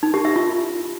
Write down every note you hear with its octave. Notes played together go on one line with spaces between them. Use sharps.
D#4
G4
E5
F4